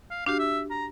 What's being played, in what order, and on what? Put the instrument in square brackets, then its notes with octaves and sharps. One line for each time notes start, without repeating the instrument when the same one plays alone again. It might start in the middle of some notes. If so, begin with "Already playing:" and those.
[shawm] F5
[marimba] D4 F#4 G4 [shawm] F5
[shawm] E5
A#5